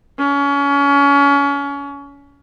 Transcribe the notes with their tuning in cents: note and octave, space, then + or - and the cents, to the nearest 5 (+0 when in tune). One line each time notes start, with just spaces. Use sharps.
C#4 +30